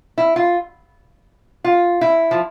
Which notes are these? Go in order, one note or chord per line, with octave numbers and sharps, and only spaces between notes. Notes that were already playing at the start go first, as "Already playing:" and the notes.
E4
F4
F4
E4
F3